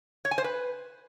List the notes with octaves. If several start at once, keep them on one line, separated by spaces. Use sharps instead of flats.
C#5
G#5
C5
B4